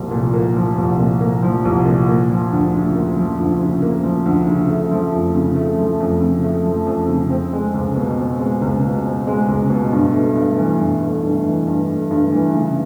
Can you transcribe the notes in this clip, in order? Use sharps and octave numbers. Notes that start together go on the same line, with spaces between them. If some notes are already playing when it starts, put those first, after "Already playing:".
Already playing: C2 F3 A#3
A#2
A#3
F3
C2
A#2
A#3
F3
C2
A#2
A#3
F3
D2
C#3
A#3
F3
D2
C#3
A#3
F3
D2
C#3
A3
F3
F2
C#3
A3
F3
F2
C#3
A3
F3
F2
C#3
C4
G#3
C#2
B2
C4
G#3
C#2
B2
C4
G#3
C#2
B2
G2
A3
G2
E3
G2
A3
G2
E3
G2
A3
G2
E3
C#3